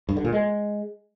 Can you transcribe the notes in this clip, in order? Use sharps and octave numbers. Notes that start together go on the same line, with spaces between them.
G2
D3
A#2
G#3